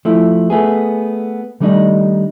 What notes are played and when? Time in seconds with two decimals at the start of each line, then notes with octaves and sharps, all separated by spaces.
0.05 F3 A3 E4
0.50 A3 B3 G#4
1.60 D#3 G3 A3 D4 D#4